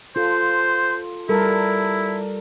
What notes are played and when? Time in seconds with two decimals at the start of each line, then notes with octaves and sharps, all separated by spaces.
0.16 F4 A4 C5
1.29 G3 E4 A4 A#4